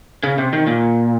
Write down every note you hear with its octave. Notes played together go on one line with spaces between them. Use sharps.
C#3
C3
D#3
A#2